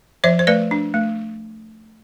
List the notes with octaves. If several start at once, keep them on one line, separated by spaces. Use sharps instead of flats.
F3 C5 E5
C5
A3 B4 D5
D4
A3